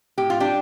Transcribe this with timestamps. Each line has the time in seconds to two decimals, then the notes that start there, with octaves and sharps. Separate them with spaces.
0.18 A2 G4
0.30 F4
0.40 G3 D4 G4